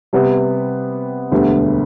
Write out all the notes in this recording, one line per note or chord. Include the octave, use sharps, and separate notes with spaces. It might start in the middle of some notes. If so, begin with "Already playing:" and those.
C3 G3 B3
E1 D2 D3 G3 B3